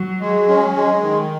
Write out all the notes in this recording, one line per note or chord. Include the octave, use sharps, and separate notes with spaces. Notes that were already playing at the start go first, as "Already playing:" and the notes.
Already playing: F#3
G#3
C#4
G#3
D#3